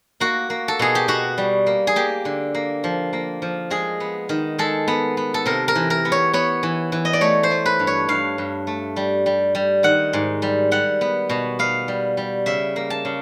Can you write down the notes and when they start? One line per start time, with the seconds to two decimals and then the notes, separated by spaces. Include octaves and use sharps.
0.20 A#3 F#4
0.50 A#3
0.68 A4
0.79 B2 G#4
0.95 G4
1.08 B2 F#4
1.38 G3
1.67 A#3
1.87 G#4
1.96 A#3 G4
2.25 D3
2.55 A#3
2.84 F3
3.13 A#3
3.42 F3
3.70 G#3 G#4
4.00 B3
4.29 D#3
4.58 G#3 A4
4.88 B3
5.17 B3
5.34 A4
5.46 C3 A#4
5.68 A#4
5.75 E3
5.90 A#4
6.05 B3
6.12 C#5
6.33 B3 C#5
6.63 E3
6.92 E3
7.05 D#5
7.13 D5
7.21 A3 C#5
7.43 C5
7.51 A3
7.66 B4
7.79 G2
7.87 C#5
8.09 G2 F5
8.38 G2
8.67 A3
8.96 G3
9.26 G3
9.55 G3
9.83 D#3 F#5
10.13 G#2
10.42 G3
10.71 G3 F#5
11.01 B3
11.29 B2
11.59 B3 F5
11.88 G3
12.17 G3
12.46 C#3 E5
12.76 A#3
12.90 A5
13.05 C#3